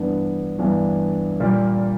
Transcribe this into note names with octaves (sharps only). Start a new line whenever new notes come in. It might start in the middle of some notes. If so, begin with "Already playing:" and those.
Already playing: G2 E3 B3 D4
G2 E3 B3 D4
A#2 G3 A#3